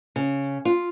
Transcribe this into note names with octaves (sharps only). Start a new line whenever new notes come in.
C#3
F4